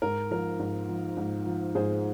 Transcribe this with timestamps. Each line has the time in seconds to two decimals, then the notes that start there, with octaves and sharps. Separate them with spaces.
0.02 G#2 A#4
0.31 F3 A#4
0.59 G#2
0.89 F3
1.17 G#2
1.46 F3
1.75 G#2 G#4 C5